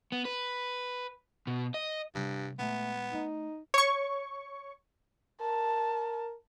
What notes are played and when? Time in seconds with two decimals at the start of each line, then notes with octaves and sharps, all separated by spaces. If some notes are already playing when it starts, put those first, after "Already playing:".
0.12 B3
0.25 B4
1.47 B2
1.74 D#5
2.15 G2 C3 G3
2.59 A#2 G#3 A3 B3
3.13 A3 D#4
3.74 C#5 C#6
5.41 A#4 A5